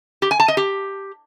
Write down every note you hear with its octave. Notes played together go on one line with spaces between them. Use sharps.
G4
G#5
A5
D#5
G4